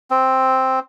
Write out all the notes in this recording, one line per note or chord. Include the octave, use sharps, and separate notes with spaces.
C4